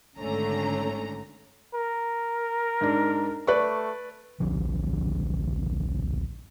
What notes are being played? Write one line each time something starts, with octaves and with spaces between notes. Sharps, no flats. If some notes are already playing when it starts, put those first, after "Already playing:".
G#1 D3 A3 C#4 A#5
A#4
G#2 D4
A3 B4 D5 C#6
D1 A#1 D3 F3